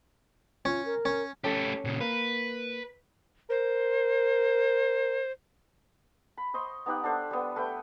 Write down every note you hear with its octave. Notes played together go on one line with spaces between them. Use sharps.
C#4 F4
A#4
C#4
A3 C#4 G4 A4
A#2 C#3
A#3 B4
A#4 C5
B5
C5 D#5 C6 C#6
B3 D#4 G4 F#5
D4 A4 C5 E5
G3 B3
A3 B4 G5